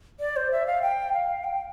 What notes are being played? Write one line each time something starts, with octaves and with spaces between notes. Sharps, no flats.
D5
C5
E5
F5
G5
F5
G5